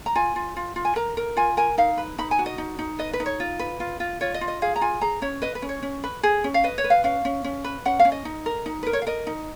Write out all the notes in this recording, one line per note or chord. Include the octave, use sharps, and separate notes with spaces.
A#5
F4 G#5
F4
F4
F4
G#5
A#4 A#5
A#4
F4 G#5
A#4 G#5
D#4 F5
B4
D#4 B5
G#5
F#4
D#5
D#4
D#4
B4 D#5
B4
D#4
C#5
F4
B4
F4
F4
F4 C#5
D#5
F4
D#5
G#4 F5
A#5
F4 G#5
G#4 A#5
C#4 C#5
B4 D#5
B4
C#4
C#5
C#4
B4
G#4
C#4
F5
B4 D#5
C#5
B4
F5
C#4 F5
C#4
C#4
B4
C#4 F#5
F5
C#4
D#5
D#4
A#4
D#4
A#4 B4
C#5
F5
A#4 D#5
D#4